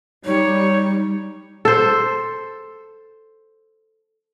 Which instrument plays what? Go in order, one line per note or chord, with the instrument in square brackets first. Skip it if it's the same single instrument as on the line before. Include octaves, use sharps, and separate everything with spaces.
[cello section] G3 [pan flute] D#4 [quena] C#5
[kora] A4 C5